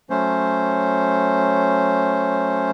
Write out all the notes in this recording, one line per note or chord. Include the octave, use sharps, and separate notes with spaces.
F#3 A3 C#4 C5